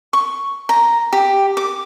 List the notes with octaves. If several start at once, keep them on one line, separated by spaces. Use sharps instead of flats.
C#6
A#5
G4
D6